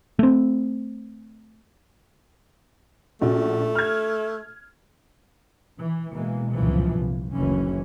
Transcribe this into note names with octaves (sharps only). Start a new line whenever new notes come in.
A3 C4
A#1 A3 C#4 F#4
F6 G#6
E3
B2 E3 G#3 A#3
G1 C#2 F#2 A#2 E3 F3
C2
F#1 D2 C#3 E3 C#4